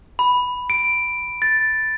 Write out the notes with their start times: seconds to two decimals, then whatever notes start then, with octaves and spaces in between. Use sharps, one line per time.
0.19 B5
0.70 D7
1.42 A6